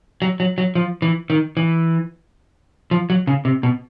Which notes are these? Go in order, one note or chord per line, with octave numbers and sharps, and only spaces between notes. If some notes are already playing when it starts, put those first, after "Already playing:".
F#3
F#3
F#3
F3
E3
D#3
E3
F3
F#3
C#3
C3
B2